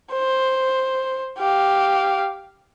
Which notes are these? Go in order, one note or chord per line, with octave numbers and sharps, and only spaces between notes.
C5
G4 F5